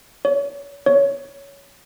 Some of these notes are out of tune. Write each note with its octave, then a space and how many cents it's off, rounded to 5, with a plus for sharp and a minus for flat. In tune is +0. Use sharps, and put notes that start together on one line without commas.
C#5 +30
C#5 +10